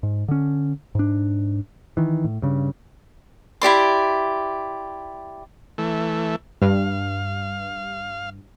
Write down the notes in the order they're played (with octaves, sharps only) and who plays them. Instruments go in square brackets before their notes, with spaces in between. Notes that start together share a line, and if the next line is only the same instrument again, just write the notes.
[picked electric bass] G#2
D3 C#4
G#2 D4
D#3 E3
A2
G2 C#3
[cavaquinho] E4 G4 D5 C6
[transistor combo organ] E3 A3
[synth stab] G2 [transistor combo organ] F5